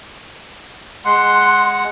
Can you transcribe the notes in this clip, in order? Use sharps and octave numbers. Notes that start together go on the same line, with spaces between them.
G#3 F#5 C6